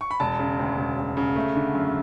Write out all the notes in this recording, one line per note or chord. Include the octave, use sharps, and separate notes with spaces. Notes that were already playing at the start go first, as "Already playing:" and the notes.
C#6
B5
E1 A5
C#3
D2
E1
E1
C#3
A3
D3
F#2